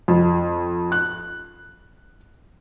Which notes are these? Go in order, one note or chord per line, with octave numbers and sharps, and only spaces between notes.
F2
F#6